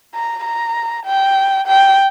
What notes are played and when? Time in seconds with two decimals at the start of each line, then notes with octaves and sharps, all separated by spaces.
0.15 A#5
0.45 A#5
1.06 G5
1.67 G5